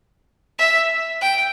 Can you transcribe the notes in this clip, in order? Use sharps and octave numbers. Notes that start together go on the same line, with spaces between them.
E5
G5